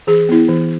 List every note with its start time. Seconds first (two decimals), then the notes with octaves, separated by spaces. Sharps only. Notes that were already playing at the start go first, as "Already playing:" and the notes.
0.07 E3 G#4
0.29 B3 E4
0.49 E3